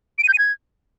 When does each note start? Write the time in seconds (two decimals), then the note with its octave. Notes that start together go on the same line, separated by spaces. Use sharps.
0.18 D7
0.23 D#7
0.28 G6
0.33 D#7
0.38 G#6